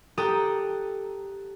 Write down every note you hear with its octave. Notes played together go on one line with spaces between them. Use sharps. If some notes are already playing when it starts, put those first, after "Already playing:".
G4 A4 G5 A#5 D#6 F#6